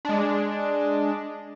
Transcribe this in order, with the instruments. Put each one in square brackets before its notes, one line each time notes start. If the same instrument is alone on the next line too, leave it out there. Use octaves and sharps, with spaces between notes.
[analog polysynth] G#3 D4